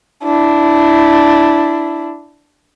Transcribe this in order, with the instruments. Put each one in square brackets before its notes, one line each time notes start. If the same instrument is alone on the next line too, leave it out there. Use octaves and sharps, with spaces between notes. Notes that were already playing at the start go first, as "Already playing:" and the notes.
[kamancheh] D4 E4